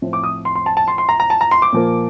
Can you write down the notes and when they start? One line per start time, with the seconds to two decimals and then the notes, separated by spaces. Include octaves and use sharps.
0.02 A2 F3 C4
0.13 D6
0.24 D#6
0.45 C6
0.55 C6
0.66 A5
0.77 A5
0.88 C6
0.98 C6
1.09 A#5
1.20 A#5
1.30 A5
1.41 A#5
1.51 C6
1.62 D6
1.72 A#2 F3 A#3